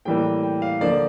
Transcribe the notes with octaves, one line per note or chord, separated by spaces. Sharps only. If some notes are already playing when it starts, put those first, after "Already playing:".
A2 E3 G3 A#3 G5
G5
F5
D3 F3 A#3 D5